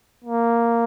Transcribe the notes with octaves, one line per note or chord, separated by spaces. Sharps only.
A#3